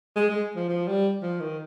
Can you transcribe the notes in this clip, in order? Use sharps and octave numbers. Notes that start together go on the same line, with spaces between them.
G#3
G#3
F3
F3
G3
F3
D#3